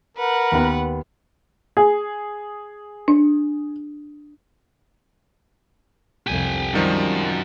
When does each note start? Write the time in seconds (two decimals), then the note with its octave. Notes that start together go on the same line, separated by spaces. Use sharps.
0.17 A#4 B4 F#5
0.52 D#2 B3
1.77 G#4
3.08 D4
6.27 C2 F2 G4 G#5
6.74 F#2 C3 D#3 F3 G3